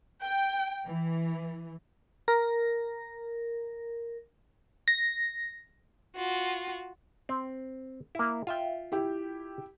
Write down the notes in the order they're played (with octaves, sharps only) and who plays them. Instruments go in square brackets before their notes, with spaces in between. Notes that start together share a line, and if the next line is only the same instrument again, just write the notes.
[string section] G5
E3
[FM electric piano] A#4 A#6
A#6
[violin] F4 F#4
[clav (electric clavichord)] C4
A#3 E4
F4 E5 G5
[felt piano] E4 G4